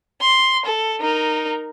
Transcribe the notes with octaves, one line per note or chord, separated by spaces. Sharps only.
C6
A4
D#4 A#4